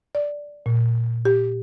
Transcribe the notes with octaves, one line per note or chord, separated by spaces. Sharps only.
D5
A#2
G4